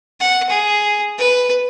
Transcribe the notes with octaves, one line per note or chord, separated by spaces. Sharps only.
F#5
G#4
B4